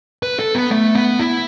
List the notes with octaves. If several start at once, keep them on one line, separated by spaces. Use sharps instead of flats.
B4
A4
B3
A3
B3
E4